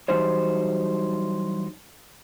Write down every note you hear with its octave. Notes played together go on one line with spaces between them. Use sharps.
E3 F#3 G3 D#4 C5 C#5